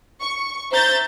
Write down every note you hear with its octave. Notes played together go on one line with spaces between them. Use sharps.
C#6
C5 E5 A#5 G6 A6